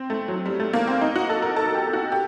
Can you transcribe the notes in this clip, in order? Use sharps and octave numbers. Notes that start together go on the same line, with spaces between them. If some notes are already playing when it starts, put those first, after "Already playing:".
Already playing: C4
A3
F#3
G3
A3
A#3
C4
D#4
F#4
A4
A#4
A4
G4
F#4
G4